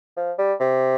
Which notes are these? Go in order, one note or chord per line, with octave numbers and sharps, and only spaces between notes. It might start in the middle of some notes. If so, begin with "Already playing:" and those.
F3
G3
C3